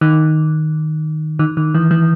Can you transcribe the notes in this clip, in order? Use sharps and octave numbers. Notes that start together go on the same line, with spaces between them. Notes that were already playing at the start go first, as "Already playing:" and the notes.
D#3
D#3
D#3
E3
E3